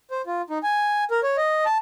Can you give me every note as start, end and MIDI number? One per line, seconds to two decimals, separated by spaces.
0.11 0.22 72
0.27 0.42 65
0.50 0.58 63
0.63 1.04 80
1.11 1.20 70
1.23 1.37 73
1.37 1.64 75
1.66 1.78 81